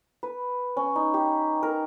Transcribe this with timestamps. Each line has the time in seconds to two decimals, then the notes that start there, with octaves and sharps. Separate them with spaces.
0.23 B4
0.77 C#4
0.96 D#4
1.14 G4
1.63 A#4